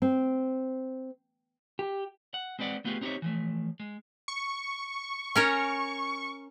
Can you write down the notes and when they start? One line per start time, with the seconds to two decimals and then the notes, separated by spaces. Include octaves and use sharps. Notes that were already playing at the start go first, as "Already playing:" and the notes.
0.02 C4
1.79 G4
2.34 F#5
2.59 G#3 C4 B4 D5 F#5
2.84 A3 B3 F4 G4 G#4 B4
3.01 C4 D#4 G4 A#4 C#5 E5
3.22 E3 F3 A3
3.80 G#3
4.28 C#6
5.36 C#4 A#4 C#5